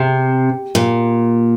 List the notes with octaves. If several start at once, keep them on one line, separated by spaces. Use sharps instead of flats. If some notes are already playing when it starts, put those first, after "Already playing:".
Already playing: C3
A#2